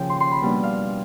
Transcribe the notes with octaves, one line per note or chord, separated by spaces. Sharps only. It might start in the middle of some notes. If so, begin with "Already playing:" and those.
Already playing: D#2 C#3 F3 G5
C6
C6
B5
B2 G3 A#3 D4
F5